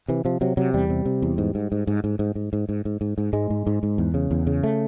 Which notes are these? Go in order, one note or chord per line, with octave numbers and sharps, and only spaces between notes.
C3 E3
C3 F3
C3 F#3
C3 F#3
E2 G3
C3
C3
E2
G#2
G#2
G#2
G#2
G#2
G#2
G#2
G#2
G#2
G#2
G#2
G#2
G#2 G#3
G#2
G#2
G#2
E2
C#3
E2
C#3
A3